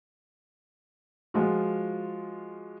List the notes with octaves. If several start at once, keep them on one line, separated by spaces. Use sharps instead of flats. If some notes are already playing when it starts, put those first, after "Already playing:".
F3 G#3 F4 F#4